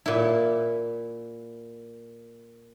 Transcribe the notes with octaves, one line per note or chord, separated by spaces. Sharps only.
A#2 E4